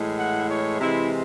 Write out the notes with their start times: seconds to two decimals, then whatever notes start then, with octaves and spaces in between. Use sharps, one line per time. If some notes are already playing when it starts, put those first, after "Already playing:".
Already playing: A2 E3 G#3
0.18 F#5
0.49 C#5
0.80 C3 E3 G#3 E4